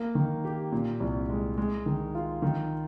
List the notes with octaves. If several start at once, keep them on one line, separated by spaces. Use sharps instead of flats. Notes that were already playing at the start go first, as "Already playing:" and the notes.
Already playing: A#3
D#3
G4
A#2
C2
G#3
G#3
D#3
F4
D#3